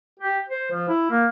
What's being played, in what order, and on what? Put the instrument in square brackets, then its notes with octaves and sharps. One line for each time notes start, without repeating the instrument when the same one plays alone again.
[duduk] G4
C5
F3
E4
A#3